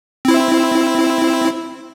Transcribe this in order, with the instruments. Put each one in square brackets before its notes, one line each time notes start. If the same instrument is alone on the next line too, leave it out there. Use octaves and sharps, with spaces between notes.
[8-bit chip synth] C4 E4